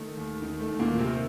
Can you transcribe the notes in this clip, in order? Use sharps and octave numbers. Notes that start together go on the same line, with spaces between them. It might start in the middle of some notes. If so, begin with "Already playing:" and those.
Already playing: D#3 A3
D#2
D#3
A3
D#2
A#2 A#3
D#3
C3 C4